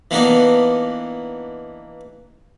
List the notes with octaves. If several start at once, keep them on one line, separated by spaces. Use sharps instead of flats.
E3 A#3 B3 D4 D#4